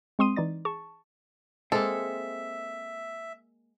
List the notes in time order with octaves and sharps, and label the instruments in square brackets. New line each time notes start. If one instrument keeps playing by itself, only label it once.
[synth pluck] G#3 C4 C6 D#6 D#7
E3 D#4 D5 A6
G#4 A5 C#6
[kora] G#3 A#3 [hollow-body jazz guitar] C4 [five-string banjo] A4 [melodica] E5